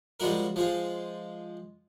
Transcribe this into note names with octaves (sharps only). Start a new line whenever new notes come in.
F3 G3 G#3 F#4 A#4
F3 G#3 F4